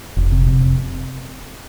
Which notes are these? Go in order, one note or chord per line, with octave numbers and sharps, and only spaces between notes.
F1
C3
C3
F1